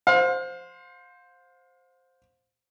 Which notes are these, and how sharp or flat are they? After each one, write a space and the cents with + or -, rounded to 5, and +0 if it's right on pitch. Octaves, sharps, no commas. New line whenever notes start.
C5 +0 F5 +35